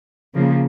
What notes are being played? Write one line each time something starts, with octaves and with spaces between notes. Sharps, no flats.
C#3 F3 A#3